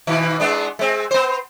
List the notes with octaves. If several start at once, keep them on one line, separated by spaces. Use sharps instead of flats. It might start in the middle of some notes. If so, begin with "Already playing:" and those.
B2 D#3
G#3 B3 D4
G#3 C4
B3 C5